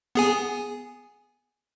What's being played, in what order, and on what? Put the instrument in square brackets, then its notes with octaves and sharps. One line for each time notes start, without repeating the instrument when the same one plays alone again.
[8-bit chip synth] B3 G#4 G#5